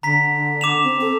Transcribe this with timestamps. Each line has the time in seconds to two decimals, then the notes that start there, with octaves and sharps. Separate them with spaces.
0.03 D3 A#5 B6
0.61 D6 E7 F7
0.83 C4
1.01 A4